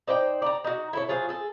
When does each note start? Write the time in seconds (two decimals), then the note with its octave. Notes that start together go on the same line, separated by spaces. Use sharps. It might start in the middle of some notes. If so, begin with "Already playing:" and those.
0.08 D#4 C5 D5 G5
0.42 D5 G5 A#5
0.64 D#4 F#4
0.93 E4 A4 C#5
1.08 F#3 F4 G#4 C5
1.29 G#4 A4